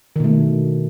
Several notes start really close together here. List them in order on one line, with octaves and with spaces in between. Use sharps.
D#3 B2 A3